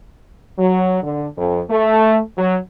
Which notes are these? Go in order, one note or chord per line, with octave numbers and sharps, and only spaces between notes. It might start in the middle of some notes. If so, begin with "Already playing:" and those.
F#3
D3
F2
A3
F#3